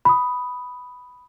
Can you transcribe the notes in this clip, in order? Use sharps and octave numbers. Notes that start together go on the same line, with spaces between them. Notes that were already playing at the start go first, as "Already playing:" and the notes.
B5 D#6